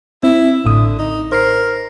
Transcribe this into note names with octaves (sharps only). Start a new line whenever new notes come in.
C4 E4
A1 A2 D3 D#6
D#4
A#4 C5 C7